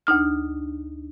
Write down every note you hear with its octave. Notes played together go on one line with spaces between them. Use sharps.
D2 D4 D#4 F6